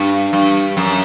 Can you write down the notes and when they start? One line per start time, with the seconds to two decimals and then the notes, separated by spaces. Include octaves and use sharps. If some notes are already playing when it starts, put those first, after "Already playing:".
Already playing: G2
0.33 G2
0.77 F#2